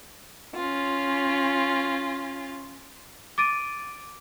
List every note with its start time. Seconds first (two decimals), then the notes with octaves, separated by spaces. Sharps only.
0.55 C#4 F4
3.38 D6 A6 D7 D#7